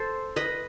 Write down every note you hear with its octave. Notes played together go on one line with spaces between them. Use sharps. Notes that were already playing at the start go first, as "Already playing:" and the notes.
Already playing: A4 C5
B4 D#5